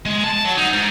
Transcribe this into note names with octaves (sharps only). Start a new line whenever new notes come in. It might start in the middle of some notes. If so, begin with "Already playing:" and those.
G#3
A5
F#3
D#4
G#2